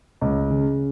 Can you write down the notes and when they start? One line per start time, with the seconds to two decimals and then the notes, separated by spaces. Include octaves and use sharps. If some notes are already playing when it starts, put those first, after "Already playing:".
0.21 C#2
0.50 C#3